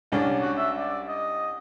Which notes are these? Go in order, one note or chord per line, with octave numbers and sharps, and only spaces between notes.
C2 C#4 D4
F#4
E5
D5
D#5